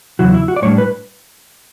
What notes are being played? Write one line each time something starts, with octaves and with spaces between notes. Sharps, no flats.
E2 C#3 F#3 E4 F#4
E4
F#4
D5
A2 G3 D4 C#5
B4